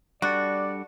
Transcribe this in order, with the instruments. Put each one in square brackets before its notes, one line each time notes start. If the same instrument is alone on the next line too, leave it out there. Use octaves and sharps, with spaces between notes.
[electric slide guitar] G3 D4 A4 [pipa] F#4 [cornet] D5